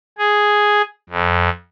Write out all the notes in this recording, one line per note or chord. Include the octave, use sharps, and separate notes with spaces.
G#4
F2